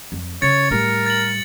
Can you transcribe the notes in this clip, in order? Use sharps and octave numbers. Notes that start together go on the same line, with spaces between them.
F2
C#3 C#5 A6 C#7
A2 G3 A#4
A6 F#7